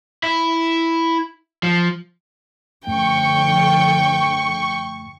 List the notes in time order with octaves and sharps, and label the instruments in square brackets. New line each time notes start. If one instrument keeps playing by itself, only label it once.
[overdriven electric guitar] E4
F3
[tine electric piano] F#2 A3 [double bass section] D3 F3 [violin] G5 [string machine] C#6